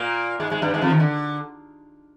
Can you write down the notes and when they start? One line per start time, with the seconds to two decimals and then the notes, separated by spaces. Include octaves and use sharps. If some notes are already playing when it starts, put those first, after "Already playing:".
Already playing: A#2 A#3
0.40 G#2 G#3
0.51 G#2 G#3
0.62 G2 G3
0.74 G#2 G#3
0.82 F2 F3
0.90 D#2 D#3
1.00 D3